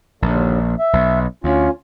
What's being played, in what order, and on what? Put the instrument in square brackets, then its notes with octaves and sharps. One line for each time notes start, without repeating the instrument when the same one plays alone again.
[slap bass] A#1 [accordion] D#2 D3
[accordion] E5
[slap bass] B1
[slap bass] D2 [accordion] C#4 F4